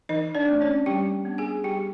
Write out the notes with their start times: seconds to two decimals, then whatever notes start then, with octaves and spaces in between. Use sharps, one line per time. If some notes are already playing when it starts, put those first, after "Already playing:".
0.09 E3 D#4 D#5
0.35 D4 D5
0.48 A3 C4
0.61 C#4 C#5
0.86 G3 G4 G5
1.25 B3 D4
1.38 G#4 G#5
1.64 G3 G4 G5